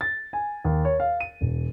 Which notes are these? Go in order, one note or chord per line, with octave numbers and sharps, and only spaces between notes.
A6
G#5
D#2
C#5
F5
D#7
E1